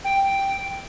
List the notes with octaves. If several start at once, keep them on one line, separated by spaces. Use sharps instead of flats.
G5